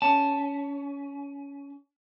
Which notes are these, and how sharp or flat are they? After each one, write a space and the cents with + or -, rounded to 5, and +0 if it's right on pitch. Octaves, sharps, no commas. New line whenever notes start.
C#4 +20 A5 -5